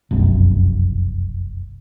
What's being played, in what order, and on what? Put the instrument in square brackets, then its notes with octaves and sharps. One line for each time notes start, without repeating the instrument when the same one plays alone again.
[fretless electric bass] F1 B1 F#2